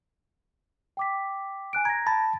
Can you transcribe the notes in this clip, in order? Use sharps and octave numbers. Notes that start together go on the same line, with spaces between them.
G5 D6 B6
G#5 F#6 D7
A#5 G#6 A#6
A5 B5 A6